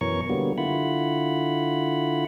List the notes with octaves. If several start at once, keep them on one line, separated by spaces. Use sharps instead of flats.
F#2 B2 E3 A#4 C#5 C#6
D3 F#3 G3 A#3 B3
D3 E4 F4 F#5 B5